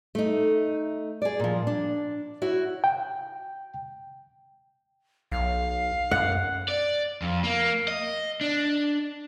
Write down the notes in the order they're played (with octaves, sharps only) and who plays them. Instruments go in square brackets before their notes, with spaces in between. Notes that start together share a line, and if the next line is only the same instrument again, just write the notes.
[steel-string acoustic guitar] A3 D#4
G#4 D5
A#2 F3
D4
E4 F#4 C#5
[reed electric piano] G5
[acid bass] B1 [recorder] F5
[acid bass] F#2 [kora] F#5
[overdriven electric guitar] D5
F2
A#3
D#5
D4